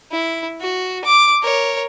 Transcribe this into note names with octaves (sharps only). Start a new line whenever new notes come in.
E4
F#4
D6
A#4 C#5